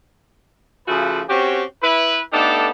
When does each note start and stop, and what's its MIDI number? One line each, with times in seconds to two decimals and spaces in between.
0.87 1.22 49
0.87 1.22 53
0.87 1.22 57
0.87 1.22 66
0.87 1.22 68
0.87 1.22 71
1.29 1.63 60
1.29 1.63 61
1.29 1.63 66
1.29 1.63 67
1.82 2.21 64
1.82 2.21 71
2.32 2.70 57
2.32 2.70 59
2.32 2.70 62
2.32 2.70 63
2.32 2.70 67
2.32 2.70 69